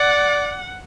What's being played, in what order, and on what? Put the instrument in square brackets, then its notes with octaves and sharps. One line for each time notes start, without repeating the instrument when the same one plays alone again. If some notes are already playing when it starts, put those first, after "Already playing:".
Already playing: [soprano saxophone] D5 [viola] F#5